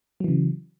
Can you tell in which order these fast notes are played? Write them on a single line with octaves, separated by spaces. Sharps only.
F#3 E3 C#3